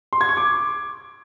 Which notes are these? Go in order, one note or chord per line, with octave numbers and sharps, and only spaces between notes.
C6
G#6
C#6
D6